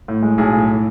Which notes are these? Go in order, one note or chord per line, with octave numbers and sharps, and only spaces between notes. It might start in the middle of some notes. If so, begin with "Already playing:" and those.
A2
G#3
B1 G#4
A2